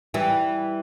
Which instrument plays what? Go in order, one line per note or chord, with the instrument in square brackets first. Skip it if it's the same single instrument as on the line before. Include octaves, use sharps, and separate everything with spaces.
[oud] E3 G3